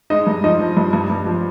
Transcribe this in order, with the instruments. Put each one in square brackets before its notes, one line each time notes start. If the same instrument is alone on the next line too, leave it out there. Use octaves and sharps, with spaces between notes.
[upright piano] G#3 D#4 D#5
G2
F3 D#4 D#5
F3
G2
G2
G2
F3